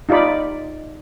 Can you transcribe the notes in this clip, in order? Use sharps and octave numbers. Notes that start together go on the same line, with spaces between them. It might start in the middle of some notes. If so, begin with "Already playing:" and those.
D#4 F4 G4 D5 B5